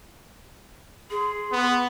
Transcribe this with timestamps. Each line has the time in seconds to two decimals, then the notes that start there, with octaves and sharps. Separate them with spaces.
1.10 G#4 C6
1.52 B3